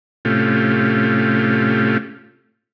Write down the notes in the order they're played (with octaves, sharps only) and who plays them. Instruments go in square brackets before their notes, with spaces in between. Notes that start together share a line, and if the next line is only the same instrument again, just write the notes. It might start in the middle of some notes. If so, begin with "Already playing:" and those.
[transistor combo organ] A2 C3 A3 C#4 F4 G4